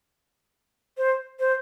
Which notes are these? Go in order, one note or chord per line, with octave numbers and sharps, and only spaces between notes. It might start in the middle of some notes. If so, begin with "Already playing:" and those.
C5
C5